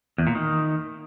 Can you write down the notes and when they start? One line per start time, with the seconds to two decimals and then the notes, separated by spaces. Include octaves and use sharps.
0.18 E2
0.27 A#2
0.35 D#3